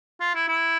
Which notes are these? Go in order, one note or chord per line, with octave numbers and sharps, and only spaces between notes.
F4
E4
E4